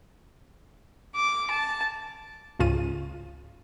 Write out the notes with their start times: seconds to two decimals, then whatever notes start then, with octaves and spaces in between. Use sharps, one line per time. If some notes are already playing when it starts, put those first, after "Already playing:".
1.16 D6
1.51 A5
2.59 C#2 G#2 C#3 F4 D#7